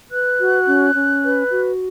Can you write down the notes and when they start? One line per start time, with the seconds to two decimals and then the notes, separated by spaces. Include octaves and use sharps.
0.11 B4 F#6
0.38 F#4
0.66 C#4
0.94 C#4
1.23 B4
1.50 F#4